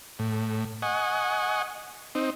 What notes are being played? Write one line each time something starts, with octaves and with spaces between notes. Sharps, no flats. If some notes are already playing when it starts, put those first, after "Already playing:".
A2
D#5 F#5 G#5 C#6
C4 D#4